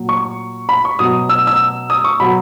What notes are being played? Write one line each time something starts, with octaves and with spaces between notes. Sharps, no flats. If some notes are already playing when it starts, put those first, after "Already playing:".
Already playing: A#2 F#3
C#6
B5
C#6
B2 F#3 D#6
E6
E6
D#6
C#6
B2 F#3 B5